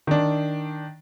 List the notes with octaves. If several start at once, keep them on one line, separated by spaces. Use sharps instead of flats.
D#3 D4